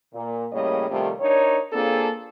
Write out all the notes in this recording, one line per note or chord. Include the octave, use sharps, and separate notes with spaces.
A#2
A2 C#3 G3 A#3 C#5 D#5
C3 D#3 F3 G3 A3
D4 D#4 A#4 C#5
A#3 C4 D4 F4 G#4 A4